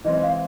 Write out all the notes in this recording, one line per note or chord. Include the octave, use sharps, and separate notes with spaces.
E3 G#3 C4 D#5
F5